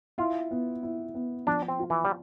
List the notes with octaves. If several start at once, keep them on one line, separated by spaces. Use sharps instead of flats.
E4 F4
B3
E4
B3
F3 D4
C4
F4
E3
G3